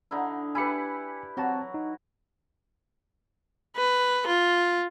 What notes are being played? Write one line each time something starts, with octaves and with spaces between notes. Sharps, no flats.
D3 D#4 E4
E4 G4 B4 G#5 B5 C#7
F#3 C4 F#4 A5
D#4
B4
F4